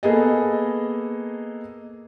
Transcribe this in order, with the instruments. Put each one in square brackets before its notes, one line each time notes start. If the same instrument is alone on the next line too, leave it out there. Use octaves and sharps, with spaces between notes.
[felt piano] A#3 B3 G#4 A4 D#5